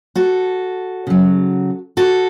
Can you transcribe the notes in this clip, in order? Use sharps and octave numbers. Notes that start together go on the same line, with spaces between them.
F#4 A4
C#3 F#3
F#4 A4